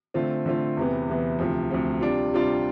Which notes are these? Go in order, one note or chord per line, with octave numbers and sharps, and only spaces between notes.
D3 A3 C4 F4
D3 A3 C4 F4
E2 C3 E3 B3
E2 C3 E3 B3
D2 C3 F3
D2 C3 F3
C3 G3 D4 F4
C3 G3 D4 F4